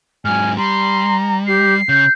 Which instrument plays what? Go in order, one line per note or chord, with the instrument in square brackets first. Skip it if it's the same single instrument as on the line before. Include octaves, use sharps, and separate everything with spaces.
[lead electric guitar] G#2 F#3 [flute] G#5 [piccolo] F6
[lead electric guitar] G3 [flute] A#5 [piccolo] C6
[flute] G4 [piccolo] C7
[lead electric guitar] C#3 [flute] G6